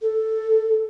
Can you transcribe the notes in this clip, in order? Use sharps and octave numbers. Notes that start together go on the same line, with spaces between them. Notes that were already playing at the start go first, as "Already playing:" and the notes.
A4